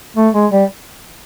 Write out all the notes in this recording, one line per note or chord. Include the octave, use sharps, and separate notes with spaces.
A3
G#3
G3